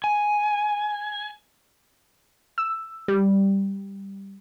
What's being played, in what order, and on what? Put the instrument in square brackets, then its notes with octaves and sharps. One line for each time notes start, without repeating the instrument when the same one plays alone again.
[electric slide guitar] G#5
[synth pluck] E6
G3